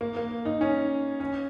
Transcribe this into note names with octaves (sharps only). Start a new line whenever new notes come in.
A#3
A#3
D#4
C#4
C#4